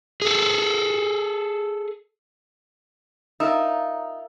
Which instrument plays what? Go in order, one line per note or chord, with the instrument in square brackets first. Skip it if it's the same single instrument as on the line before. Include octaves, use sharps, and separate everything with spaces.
[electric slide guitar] G#4 A4
[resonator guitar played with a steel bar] D#4 [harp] F4 A#4 E5